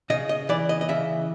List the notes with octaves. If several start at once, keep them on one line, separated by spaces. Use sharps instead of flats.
C#3 D#5
D#5
E3 D5
D#5
D#5
C#3 E5